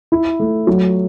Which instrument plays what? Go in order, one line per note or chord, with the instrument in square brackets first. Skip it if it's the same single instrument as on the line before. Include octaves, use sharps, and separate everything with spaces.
[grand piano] E4
A3
F#3